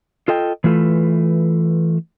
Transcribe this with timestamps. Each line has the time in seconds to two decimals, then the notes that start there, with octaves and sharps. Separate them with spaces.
0.28 F4 A4 D#5 G5
0.64 E3 A3 F4 A4 B4